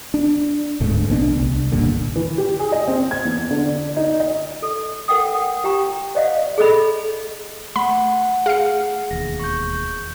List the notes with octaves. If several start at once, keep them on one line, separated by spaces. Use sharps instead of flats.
D4
D1 D2 G#2 A3
A#1 B2 C#4 D4
C2
D#1 G2 A#2 D3
E3
G4
G#4
D#5
C4
G#6
E2
D3
D5
D#4
D#5
A4
A4 A#4 F#5 G5 D#6
F#5
G4 G5 A#5 C#6
C5 D5 D#5 F5 F#5
G#4 A4 D#5 B5
A3 F#5 B5
G#4 F5 C#7
E1 D#2 A#6
C#6 G6